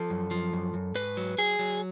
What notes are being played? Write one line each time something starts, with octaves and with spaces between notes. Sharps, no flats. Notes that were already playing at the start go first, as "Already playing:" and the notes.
Already playing: F3 A4
F#2
F3
F#2
F#2
G#2 B4
F#3
F#3 G#4
F#3